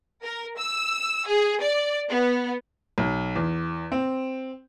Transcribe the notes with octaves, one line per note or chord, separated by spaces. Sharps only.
A#4
E6
G#4
D5
B3
B1
E2
C4